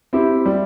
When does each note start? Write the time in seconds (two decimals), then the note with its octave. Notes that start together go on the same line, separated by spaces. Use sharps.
0.13 C4 E4 G4
0.46 G3